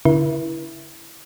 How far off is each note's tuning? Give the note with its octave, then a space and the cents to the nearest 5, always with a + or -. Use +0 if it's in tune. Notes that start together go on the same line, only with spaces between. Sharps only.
D3 -35 E4 +0 B4 -45